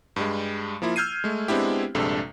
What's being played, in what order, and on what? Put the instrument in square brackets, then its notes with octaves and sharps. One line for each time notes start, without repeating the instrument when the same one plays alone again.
[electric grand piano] G2 G3 G#3
F3 A#3 E4 F4
E6 F6 G6 G#6 C7 D#7
G#3 A3
G#3 B3 C4 D4 E4 G4
A#1 G2 C3 G#3 D4 A4